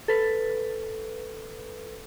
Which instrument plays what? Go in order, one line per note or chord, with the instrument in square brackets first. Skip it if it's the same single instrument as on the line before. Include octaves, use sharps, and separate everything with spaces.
[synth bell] A4 B4